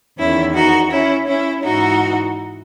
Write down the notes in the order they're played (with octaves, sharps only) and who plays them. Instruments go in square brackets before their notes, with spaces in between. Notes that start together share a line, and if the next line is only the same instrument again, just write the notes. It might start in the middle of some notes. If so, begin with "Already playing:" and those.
[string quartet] E2 D#3 C#4 E4
D#4 F#4
C#4 E4
C#4 E4
G#2 E3 D#4 F#4